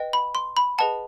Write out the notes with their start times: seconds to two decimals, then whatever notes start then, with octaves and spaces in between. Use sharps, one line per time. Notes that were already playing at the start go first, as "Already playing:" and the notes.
Already playing: B4 D#5 G5
0.13 B5
0.35 C6
0.57 B5
0.78 G#4 B4 D#5 F#5 A5